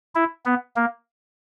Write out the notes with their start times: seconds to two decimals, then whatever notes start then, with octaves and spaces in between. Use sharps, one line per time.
0.15 E4
0.46 B3
0.76 A#3